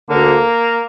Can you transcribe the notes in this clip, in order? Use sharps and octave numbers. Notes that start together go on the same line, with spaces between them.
D2 D3 A#3